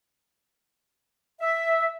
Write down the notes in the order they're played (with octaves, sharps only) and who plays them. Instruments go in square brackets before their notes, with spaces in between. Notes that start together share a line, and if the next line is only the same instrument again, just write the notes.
[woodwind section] E5